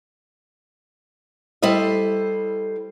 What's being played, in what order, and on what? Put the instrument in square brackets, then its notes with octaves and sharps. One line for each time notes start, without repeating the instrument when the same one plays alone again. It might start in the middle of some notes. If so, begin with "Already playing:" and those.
[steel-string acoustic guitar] G3 E4 A4 C5 D#5